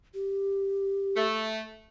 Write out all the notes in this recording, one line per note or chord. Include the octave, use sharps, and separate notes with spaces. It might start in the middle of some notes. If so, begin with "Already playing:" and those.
G4
A3